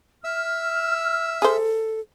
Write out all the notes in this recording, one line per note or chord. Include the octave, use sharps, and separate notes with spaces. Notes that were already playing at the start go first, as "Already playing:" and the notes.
E5 E6 F6
G#4 A4 C5